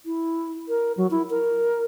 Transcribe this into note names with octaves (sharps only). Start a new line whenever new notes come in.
E4
A#4
F#3
E4
A#4